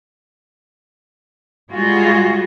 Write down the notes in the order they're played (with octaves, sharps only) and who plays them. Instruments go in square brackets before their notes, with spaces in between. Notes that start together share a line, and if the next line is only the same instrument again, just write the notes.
[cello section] G3 G#3 F4 F#4 G#4